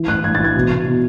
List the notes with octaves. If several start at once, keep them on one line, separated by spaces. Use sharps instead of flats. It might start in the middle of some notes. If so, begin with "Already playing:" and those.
Already playing: E3
A2 F#6
A2 G#6
A6
E3 G#6
B2
B2
B2